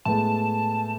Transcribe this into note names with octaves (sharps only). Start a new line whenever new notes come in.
A2 G#3 B3 A5